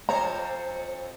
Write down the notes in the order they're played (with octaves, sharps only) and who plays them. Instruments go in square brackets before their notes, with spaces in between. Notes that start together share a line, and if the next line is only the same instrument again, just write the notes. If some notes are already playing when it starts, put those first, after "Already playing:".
[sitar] F2 C5 C#5 [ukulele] A#5